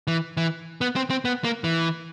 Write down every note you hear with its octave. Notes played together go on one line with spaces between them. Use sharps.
E3
E3
B3
C4
C4
B3
A#3
E3